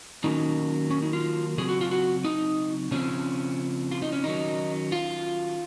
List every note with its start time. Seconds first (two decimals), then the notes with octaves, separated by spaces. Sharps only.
0.24 D#3 F#3 A#3 C#4 D#4
0.90 C#4
1.02 D#4
1.13 F4
1.57 C#3 F#3 C4 G#4
1.69 F#4
1.81 F4
1.91 F#4
2.24 D#4
2.91 C#3 F3 C4 C#4
3.91 F4
4.02 D#4
4.12 C#4
4.24 D#3 F#3 C#4 D#4
4.92 F4